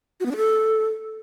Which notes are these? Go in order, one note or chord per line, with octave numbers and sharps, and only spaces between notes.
F#4
B3
D4
A4